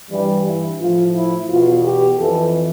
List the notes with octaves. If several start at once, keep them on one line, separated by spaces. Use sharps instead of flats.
G2 E3 G3
E4
A2 F3 F4
E4
E2 B2 F4
G4
F2 E3 A4